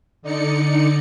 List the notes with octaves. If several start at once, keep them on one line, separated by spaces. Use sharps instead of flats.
D3 D#4 D5 C#7